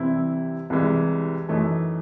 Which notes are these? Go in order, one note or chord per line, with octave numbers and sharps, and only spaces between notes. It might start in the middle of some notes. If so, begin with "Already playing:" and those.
Already playing: C2 C3 E3 C4 E4
C2 C3 E3 G#3
F#2 E3 A3 D#4